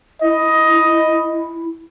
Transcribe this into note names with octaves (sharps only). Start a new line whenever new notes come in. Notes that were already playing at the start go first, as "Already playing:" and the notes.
E4 D#5